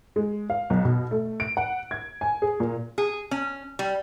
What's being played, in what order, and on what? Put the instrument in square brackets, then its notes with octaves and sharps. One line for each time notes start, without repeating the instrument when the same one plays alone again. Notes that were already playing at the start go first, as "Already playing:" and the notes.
[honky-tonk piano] G#3
F5
B1
B2
A3
D7
F#5
G#6
G#5
G#4
A#2
[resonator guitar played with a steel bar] G#4
C#4
G3